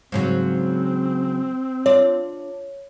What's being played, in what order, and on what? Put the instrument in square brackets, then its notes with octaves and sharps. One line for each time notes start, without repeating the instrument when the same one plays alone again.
[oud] G#2 C#3 F#3 [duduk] C4
[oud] D4 F4 [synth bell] C#5